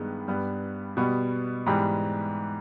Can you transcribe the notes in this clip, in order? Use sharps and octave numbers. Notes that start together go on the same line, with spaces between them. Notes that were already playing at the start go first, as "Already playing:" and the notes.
Already playing: G2 D#3 G#3 B3
G2 G3 B3
B2 G3 B3
G#2 E3 G3 B3 G4